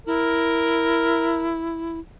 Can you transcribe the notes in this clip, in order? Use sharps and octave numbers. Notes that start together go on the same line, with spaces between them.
E4 A#4